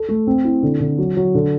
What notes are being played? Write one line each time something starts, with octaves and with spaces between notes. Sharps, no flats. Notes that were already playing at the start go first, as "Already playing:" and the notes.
Already playing: A4
A3
C4
E4
D3
D3
F#3
F#3
D3